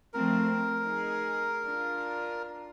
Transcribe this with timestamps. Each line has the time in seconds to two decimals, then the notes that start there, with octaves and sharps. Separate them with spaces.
0.13 F3 A3 C4 A#4
0.83 D#4 G#4
1.62 D4 F4